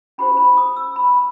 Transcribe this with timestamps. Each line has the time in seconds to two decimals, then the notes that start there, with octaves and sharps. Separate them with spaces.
0.18 C#4 E4 G4 C5 B5
0.37 B5
0.57 D#6
0.76 E6
0.96 B5